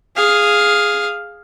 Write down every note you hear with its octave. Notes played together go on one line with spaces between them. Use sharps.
G#4 F5